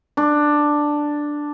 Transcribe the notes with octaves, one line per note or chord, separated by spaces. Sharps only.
D4